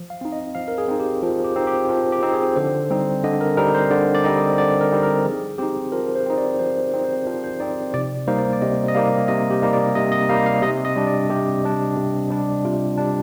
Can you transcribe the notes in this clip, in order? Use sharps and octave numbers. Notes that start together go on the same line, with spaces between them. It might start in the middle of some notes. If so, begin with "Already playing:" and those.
Already playing: F3
F5
C4 D#4
D#5
F3 F5
A#4
G#4
C4 D#4
G4
F3 F4
G4
C4 D#4
G4
F3 F4
G4
C4 D#4
G#4
D3 C5
G3 C4 D#4
D3 D#5
A#4
G3 C4 D#4 A#4
C5
D3 D5
D5
G3 C4 D#4 D#5
D3 D5
A#4
G3 C4 D#4
A#4
F3 G#4
C4 D#4 G4
F3 A#4
C5
C4 D#4
D5
F3 C5
C4 D#4
C5
F3 C5
C5
C4 D#4 D5
C3 D5
G3 A#3 D#4 C5
D5
D5
C3 D#5
D#5
G3 A#3 D#4 F5
C3 D#5
G4
G3 A#3 D#4
D5
C3 D#5
D#5
G3 A#3 D#4 F5
F5
C3 D#5
D#5
G3 D4
D5
C3 G4
G3 D4
C3
G3 D4
C3 F4
G3 D4